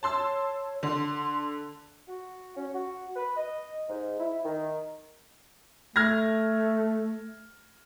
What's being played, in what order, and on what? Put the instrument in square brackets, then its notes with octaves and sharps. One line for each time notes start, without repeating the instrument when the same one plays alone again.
[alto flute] C#5 [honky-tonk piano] A5 C6 E6
[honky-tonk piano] D3 [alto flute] C6
[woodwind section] F#4
C#4
F#4
B4
D#5
G#2
E4
D#3
[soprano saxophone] A3 [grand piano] F6 G#6 A#6